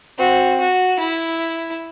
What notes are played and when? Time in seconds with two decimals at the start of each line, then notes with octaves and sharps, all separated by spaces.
0.19 C4 F#4
0.59 F#4
0.99 E4